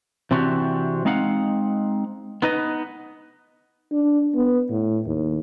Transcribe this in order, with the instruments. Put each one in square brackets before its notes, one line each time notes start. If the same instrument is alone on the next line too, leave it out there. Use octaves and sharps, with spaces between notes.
[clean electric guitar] C3 E3 C4 D4 F#4 G4
G#3 C4 D#4 F5 F#5
B3 D#4 B4 D#5
[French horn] D4
B3
A2
D#2